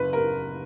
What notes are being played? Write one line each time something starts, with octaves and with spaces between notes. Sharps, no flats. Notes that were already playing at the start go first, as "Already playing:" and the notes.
Already playing: F#1 B4
A#4